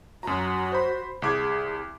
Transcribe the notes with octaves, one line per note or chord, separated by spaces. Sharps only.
F#2 F#4 A#5
C5 B5
C2 G#4 D6 G#6